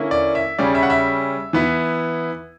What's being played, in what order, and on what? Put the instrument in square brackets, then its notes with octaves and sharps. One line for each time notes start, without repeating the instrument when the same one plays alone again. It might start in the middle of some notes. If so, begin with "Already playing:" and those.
Already playing: [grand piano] D3 A#3 C#4 E4
D5
E5
C#3 G3 C#4 D5
E5
F#5
E5
E3 B3 E4